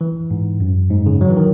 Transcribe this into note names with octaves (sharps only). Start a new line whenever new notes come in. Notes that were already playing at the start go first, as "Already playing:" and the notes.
E3
G#2
F#2
G#2
C#3
F#3
E3
D#3